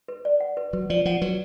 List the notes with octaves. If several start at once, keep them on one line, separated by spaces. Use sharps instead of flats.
B4
D5
F#5
B4
F#3 B4
F3 D5
F3 F#5
F#3 B4